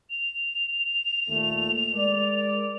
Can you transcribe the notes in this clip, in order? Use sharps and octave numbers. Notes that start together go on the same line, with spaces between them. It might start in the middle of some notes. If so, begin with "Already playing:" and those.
F7
D#2 A#2 A3
G#3 A#4 D5